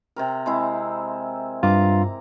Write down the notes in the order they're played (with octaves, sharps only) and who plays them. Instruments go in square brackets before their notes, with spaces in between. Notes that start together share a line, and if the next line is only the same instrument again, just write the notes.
[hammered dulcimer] C3 C4 A#4
G#3 C4 E4
[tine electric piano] G2 F4 [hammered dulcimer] A#5 D6